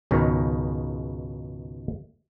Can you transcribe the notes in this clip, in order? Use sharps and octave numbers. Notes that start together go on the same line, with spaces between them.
C#2 G#2 B2 D#3 G#3